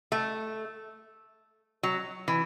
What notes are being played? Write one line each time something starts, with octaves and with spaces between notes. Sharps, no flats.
A3
F#3
E3